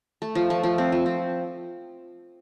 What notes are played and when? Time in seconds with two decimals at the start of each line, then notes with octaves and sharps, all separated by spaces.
0.22 A3
0.35 F3
0.50 A3
0.63 F3
0.78 C4
0.92 F3
1.06 C4